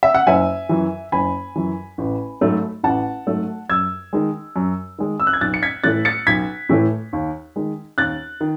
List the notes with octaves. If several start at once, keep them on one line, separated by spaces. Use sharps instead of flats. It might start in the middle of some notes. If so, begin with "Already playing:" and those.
E5
F#5
F#1 E5 G#5
F#2 E3
F#1 G#5 B5
F#2 E3
A1
G#2 F#3 A3
A1 F#5 A5
G#2 F#3 A3
F#2 E6 G#6
D#3 G#3
F#2
D#3 G#3
E6
F#6
G#6
B1 F#6 A6
C#7
G#6 B6
A2 E3 A3 F#6 A6
A6 C#7
B1 G#6 B6
A2 E3 A3
D#2
D#3 G#3
D#2 F#6 A6
D#3